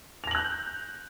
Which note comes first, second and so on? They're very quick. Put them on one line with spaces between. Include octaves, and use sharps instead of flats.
F7 A#6 F#7 F#6 G6